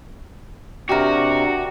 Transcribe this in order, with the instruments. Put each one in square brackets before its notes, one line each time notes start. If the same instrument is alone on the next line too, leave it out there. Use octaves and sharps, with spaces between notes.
[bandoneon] C3 [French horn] D4 [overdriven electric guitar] F#4 [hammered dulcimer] G4 A#4